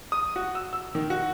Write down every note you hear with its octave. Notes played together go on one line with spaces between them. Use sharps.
D#6
F#4
E6
E6
D#3
F#4